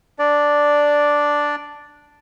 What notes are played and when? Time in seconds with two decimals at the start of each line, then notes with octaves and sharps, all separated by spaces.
0.19 D4 D5